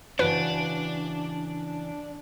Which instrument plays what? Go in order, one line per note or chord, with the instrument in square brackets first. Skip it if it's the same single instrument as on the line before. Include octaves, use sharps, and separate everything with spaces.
[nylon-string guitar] C#3 E3 F#4 [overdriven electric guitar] D4 [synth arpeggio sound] B4